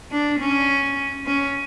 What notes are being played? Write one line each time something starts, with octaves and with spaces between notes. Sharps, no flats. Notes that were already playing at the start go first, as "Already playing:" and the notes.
D4
C#4
C#4